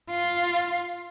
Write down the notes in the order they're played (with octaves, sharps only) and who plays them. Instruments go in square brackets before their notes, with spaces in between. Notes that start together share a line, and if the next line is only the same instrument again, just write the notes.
[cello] F4